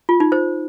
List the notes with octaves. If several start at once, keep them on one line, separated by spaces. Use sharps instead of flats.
F4
D#4
C5